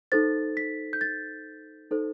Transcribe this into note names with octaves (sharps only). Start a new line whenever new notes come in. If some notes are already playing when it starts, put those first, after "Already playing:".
D#4 A4 C5 A6
B6
G6
A6
D#4 A4 C5